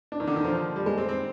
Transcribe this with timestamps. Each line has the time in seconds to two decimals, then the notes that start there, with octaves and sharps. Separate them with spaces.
0.12 D4
0.20 D#3
0.28 D3
0.36 D#3
0.44 F3
0.76 G3
0.86 G#3
0.98 C4
1.09 C4